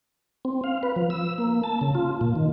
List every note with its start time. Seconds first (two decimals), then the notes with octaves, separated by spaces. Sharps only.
0.45 C4
0.64 F5
0.83 B4
0.96 F3
1.10 E6
1.38 A#3
1.64 A5
1.81 C#3
1.95 F4
2.21 A#2
2.36 D#3